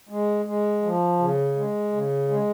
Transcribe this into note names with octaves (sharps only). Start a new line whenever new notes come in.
G#3
G#3
F3
C#3
G#3
C#3
G#3